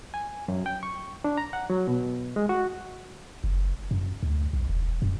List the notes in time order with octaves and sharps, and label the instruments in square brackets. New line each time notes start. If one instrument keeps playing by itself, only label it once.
[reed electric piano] G#5
F#2
G5
C#6
D4
A#5
F#5
F#3
B2
G#3
F#4
[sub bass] F#1
F#2
D2
B1
E1
F#2